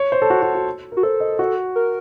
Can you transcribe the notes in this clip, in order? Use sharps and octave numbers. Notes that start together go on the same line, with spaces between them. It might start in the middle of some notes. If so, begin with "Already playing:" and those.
Already playing: C#5
C5
A4
F#4
F#4
F#4
F#4 A#4
A4 C5
D#5
F#4
A#4